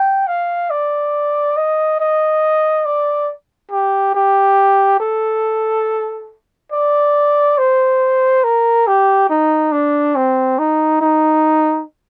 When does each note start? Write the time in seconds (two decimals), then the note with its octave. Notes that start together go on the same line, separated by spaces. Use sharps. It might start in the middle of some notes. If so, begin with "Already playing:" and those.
Already playing: G5
0.28 F5
0.70 D5
1.57 D#5
2.00 D#5
2.86 D5
3.71 G4
4.14 G4
5.00 A4
6.72 D5
7.58 C5
8.44 A#4
8.87 G4
9.30 D#4
9.72 D4
10.16 C4
10.59 D#4
11.01 D#4